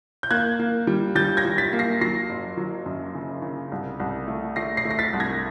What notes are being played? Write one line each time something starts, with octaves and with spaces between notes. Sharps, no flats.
G6
A#3 F#6 G#6
A#3
G3
G3 G6 A6
G#6 A#6
G3
A6 B6
A#3
A#6 C7
F#3 A#6 C7
F#1
F#3
F#2
C#3
C#3
C2
C2
A3
A3 A#6 C7
A#6 C7
A3
A#6
A6 B6
C2
G#6 A#6